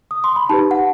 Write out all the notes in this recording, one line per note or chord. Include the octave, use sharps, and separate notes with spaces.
D#6
C6
B5
D#4 G4 B4 A5
F#5